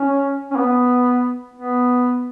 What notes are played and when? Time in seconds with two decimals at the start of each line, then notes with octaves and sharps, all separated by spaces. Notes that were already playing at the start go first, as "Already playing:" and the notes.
Already playing: C#4
0.51 C#4
0.56 B3
1.54 B3